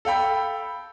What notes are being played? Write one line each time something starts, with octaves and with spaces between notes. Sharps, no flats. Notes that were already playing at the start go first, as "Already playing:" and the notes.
A4 F5 G5 B5